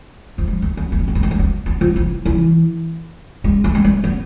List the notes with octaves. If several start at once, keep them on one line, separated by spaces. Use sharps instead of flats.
F3
G#3
A3
B3
A3
B3
A3
B3
A3
B3
A3
B3
F3
E3
E3
G#3
A3
G#3
A3
B3